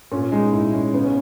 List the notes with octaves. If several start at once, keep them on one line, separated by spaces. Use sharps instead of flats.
A#2 C#4
G#3 D#4
A#2 E4
G#3 C#4
C#3 B3
C#4